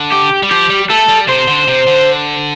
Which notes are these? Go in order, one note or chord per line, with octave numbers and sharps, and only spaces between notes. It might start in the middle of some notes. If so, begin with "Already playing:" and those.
Already playing: D3
G4
G3
F3 G4
G3
A3 A4
G3
C3 C5
D3
C3
D3